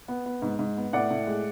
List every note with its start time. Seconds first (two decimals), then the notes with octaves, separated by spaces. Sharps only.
0.08 B3
0.26 B3
0.42 G#2
0.59 G#2
0.77 B3
0.93 A2 D5 F#5
1.11 A2
1.27 G#3